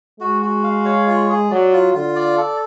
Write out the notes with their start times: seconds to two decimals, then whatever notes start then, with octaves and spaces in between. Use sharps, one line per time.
0.20 G#3 F#4
0.42 F#4
0.64 F5
0.85 C#5
1.07 F4
1.29 G#4
1.50 F#3 D5
1.73 F4
1.95 D3 F4
2.16 D5
2.37 A4